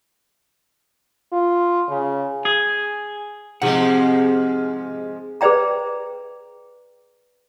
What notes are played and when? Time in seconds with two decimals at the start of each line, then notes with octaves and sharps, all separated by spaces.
1.33 F4
1.89 C#3
2.45 G#4
3.62 G#2 C3 F3 G#3 G4 G#4 F#5
5.41 G#4 B4 C5 D5 G5 A#5